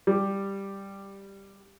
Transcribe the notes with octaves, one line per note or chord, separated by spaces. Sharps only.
G3 G4